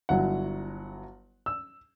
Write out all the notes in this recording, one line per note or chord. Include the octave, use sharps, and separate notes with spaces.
G1 F#3 E4 F#5
E6